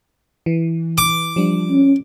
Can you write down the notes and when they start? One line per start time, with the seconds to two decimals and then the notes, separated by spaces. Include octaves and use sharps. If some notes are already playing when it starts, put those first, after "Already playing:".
0.46 E3
0.98 D6
1.36 F3 G3 D4
1.70 C#4